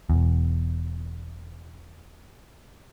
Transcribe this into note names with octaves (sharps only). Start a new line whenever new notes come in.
E1 E2